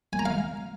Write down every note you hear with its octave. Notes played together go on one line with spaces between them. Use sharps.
G#5
A#5
F5